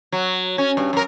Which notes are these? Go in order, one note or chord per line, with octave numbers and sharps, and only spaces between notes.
F#3
C#4
G2
F#2 A#4